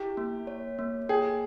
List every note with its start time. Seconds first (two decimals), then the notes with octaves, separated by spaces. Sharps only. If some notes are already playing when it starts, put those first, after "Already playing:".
Already playing: E4 G4
0.17 A#3
0.47 C#5
0.79 A#3
1.09 G#4 G5